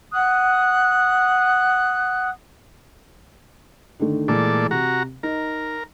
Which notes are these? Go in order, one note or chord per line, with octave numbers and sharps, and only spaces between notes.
F#5 D#6 F#6
D3 D#3 A3
A#2 E3 G#3 A3 A4 D5
C3 F#4 A#5
D#4 A#4